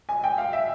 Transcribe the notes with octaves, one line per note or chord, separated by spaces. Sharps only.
G#5
G5
F5
E5